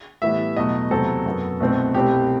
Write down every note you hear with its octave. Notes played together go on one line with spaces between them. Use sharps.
A2 E3 G3 B3 E5
E2 B2 F#3 A3 D#5
E2 C3 F#3 A3 C4 A4
F#2 F#3 B3
C2 B2 A3 C4
C2 B2 A3 C4 G4